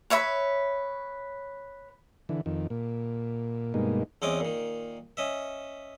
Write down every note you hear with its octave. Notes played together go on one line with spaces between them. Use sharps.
B4 C#5 E5 B5
D3 E3
F2 D#3
A#2
G2 B2 G#3 A#3 D#4
E2 C4 C#4 D#5 D6
A#2 D#3
C#4 D#5 E5